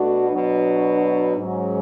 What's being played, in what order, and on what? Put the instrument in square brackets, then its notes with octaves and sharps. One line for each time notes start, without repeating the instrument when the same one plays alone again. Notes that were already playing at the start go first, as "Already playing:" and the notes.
Already playing: [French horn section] B2 A3 D4 F#4
B2 F#3 B3 D4
G#2 F#3 C#4